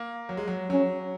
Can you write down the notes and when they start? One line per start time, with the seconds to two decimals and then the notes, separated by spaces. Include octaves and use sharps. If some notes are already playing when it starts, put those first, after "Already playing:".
Already playing: A#3
0.29 F#3
0.37 G#3
0.48 F#3
0.70 F#3 C#4